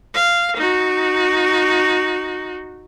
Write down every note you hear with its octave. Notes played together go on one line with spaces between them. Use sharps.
F5
D#4 F#4